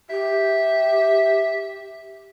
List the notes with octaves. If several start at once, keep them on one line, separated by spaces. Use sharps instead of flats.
G4 E5